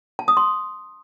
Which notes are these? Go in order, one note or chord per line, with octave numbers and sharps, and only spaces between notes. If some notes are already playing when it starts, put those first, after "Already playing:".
A5
D#6
C6